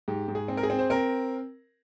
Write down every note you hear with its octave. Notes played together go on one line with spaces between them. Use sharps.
G#2 G4
G#2
G#4
C4
A#4
G#4
C4
C5
C4 A#4